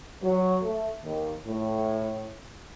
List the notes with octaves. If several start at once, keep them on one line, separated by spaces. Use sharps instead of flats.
F#3
A3
D#2
A2